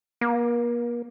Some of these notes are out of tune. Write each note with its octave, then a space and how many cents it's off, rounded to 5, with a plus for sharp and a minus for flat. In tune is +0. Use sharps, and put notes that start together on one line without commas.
A#3 +40